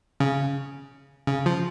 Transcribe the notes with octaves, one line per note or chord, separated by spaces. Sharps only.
C#3
C#3
F3